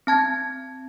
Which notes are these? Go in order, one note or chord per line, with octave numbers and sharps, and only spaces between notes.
C4 A5 G#6